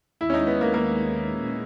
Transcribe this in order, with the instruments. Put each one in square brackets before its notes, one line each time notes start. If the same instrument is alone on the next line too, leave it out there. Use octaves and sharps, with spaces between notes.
[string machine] D#2 D#3 G#3 [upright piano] E4
[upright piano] C#4
D#4
B3
A#3
A#3
[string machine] A#2 G#3 C#4